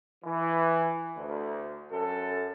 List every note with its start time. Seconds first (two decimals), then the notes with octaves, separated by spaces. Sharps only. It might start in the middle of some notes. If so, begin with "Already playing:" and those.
0.24 E3
1.17 D2
1.92 F#2 A4